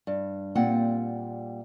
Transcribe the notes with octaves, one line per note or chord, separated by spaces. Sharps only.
G2
A#2 G3 A#3 C4 F#5 G5